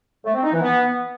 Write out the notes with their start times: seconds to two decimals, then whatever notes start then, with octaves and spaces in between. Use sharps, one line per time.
0.25 A3
0.34 C4
0.43 D#4
0.53 E3
0.62 B3